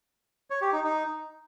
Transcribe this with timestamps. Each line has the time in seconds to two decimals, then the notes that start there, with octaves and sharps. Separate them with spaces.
0.50 C#5
0.62 G4
0.73 D#4
0.84 D#4